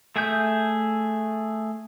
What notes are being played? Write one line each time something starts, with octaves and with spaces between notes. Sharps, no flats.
A3 G#4 E5 G6